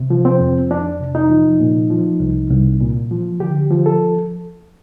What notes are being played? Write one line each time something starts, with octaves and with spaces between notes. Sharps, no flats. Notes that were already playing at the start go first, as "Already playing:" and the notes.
Already playing: C3
F3
C4
F2
F2 D4
C3
D#4
F3
A#2
F3
C2
C2
A#2
F3
D3 G4
F3
A4